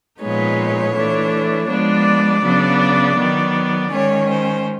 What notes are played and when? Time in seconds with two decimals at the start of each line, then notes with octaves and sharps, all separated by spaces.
0.20 A#2 F3 G#3 B3 D#4 C#5
0.95 E3 A3 D4
1.68 F3 G#3 B3 D4 D5
2.44 C#3 F#3 B3 D4
3.17 D#3 F#3 B3
3.92 D#3 G#3 C#4 C#5
4.29 C5